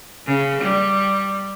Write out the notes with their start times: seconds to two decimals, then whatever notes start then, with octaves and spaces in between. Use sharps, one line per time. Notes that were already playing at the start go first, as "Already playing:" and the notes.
0.26 C#3
0.61 G3